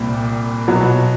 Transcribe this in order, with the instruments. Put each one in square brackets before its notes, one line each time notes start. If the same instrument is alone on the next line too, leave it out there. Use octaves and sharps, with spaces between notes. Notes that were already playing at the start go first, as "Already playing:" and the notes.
Already playing: [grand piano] C2 A#2 G3 C4
B2 F#3 B3